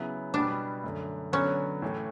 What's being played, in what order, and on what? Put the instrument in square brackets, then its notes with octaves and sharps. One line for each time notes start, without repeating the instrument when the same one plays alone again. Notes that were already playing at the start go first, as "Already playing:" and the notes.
Already playing: [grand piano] C#3 F#3 B3 E4
[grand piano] B2 G3 B3 [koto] D4
[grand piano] F#2 D3 A3
[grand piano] D3 F#3 B3 [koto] C#4
[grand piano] A2 E3 A3